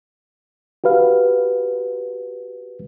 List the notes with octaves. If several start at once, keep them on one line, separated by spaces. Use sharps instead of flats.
F#4 G4 B4 F5